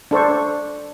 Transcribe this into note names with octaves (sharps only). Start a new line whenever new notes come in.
D4 A4 C5 C#6